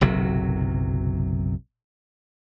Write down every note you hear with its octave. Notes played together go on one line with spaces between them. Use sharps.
F#1 B1 C3 F#3